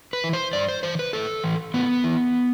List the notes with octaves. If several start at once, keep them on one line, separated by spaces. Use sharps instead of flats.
B4
E3
C5
G2 D5
C5
E3 C5
B4
A2 A4
E3
A2 B3
E3